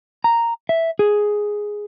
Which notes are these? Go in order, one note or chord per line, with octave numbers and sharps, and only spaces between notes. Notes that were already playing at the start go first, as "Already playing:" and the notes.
A#5
E5
G#4